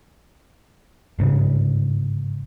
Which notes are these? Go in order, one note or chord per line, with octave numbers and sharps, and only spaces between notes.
G1 G#2 C#3